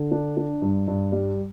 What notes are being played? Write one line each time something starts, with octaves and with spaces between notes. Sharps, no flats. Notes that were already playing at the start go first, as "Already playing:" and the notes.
Already playing: D3
D4
D4
G2
G2
G3